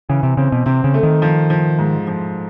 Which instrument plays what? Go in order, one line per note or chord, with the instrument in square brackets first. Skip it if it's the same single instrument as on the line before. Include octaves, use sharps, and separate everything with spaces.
[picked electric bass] C#3 [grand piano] E3
[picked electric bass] C3
[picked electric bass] C#3 [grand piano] C4
[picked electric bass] B2
[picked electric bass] C3 [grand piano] C4
[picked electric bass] C#3
[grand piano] A3
[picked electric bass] D#3
[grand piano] F3
F3
G#2
F3